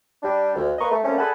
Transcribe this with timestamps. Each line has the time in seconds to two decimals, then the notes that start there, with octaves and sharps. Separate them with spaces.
0.23 G3 D4
0.56 D2
0.79 A#3 A#4 B4 D#5 A#5 C#6
0.90 A3
1.04 G3 A3 A#3 C4 C#4
1.18 G#4 A4 D5 F#5 G#5 B5